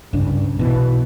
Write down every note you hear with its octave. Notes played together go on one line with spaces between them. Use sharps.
C2 G2 C#3 D4
B1 B2 E3